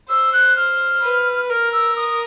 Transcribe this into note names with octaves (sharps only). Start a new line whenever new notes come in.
C5 E6
F#6
F6
B4
A#4 F6
E6
D#6